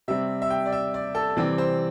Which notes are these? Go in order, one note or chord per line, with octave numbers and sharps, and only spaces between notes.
C3 G3 C4 E5
E5
G5
D5
E5
D5
A4
C3 E3 G3 C4 D5
C5